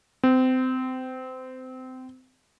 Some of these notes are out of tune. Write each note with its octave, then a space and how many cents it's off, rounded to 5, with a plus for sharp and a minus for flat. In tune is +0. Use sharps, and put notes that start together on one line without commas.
C4 -25